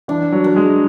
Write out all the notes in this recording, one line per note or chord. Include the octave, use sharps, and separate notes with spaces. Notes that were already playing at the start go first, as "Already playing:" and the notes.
E3 D4
F#3
A#4
G#3